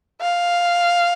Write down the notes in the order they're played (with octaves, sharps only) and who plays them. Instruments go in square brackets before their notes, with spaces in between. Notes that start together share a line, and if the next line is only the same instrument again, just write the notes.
[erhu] F5